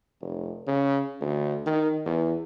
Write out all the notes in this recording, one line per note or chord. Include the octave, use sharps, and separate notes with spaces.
F1
C#3
D2
D#3
E2